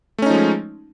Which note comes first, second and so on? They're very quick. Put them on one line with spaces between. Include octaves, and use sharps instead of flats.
A3 C#4 D#4 F3 G#3